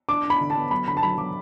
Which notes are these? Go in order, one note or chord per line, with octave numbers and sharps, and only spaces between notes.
D4 D6
D4
B5
D3
A5
B3
F#3 B5
D3 B5
A5
F#3 B5
F#3 D6